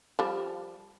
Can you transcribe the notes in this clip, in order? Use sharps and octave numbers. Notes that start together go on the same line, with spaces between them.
F3 G3